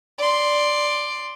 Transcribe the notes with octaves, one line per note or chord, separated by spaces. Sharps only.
D5 C6